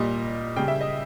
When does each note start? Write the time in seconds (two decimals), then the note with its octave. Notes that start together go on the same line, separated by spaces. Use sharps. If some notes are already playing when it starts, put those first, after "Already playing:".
Already playing: A#2 G3 D#5
0.56 C#3 G3 G5
0.68 E5
0.81 D#5